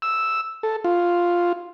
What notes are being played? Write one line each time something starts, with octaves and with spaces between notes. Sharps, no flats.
E6
A4
F4